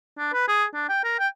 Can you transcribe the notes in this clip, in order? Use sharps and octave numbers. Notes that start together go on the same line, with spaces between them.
D4
B4
G#4
D4
G5
A#4
G5